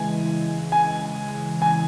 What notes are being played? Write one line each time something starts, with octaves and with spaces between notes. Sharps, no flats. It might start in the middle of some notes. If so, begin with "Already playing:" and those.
Already playing: C#3 E3 G#3 G#5
G#5
G#5